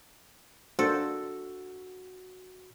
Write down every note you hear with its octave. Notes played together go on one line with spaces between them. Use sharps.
A#3 D4 F#4 A4 C5